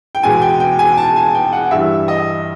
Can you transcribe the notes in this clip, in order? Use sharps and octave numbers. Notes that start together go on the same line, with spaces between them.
G5
E2 B2 G#3 G#5
G5
G5
G#5
A5
G#5
G5
F#5
G2 E3 G3 E5
D#5